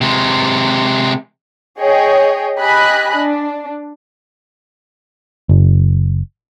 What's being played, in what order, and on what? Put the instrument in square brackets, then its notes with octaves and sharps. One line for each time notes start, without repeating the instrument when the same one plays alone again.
[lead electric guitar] C3 G#3
[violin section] G#4 C#5 D#5 G5
G4 D#5 G#5 B5 F#6
D4
[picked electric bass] F#1